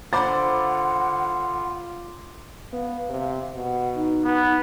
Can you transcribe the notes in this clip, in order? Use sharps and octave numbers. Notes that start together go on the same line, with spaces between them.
D3 F4 C5 F#5 B5 D6 A6
B3 F5
C3
B2 F#5
D#4
B3